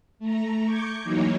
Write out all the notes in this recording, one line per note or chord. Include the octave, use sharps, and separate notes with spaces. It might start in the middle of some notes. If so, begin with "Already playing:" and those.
A3 A#5
C#6 D6 G6 G#6 C#7
E3 F#3 A#3 D#4 C#5